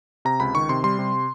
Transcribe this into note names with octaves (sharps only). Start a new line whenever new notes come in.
C3 A#5
C#2 B5
D#3 C#6
C3 C6
G3 C6
C3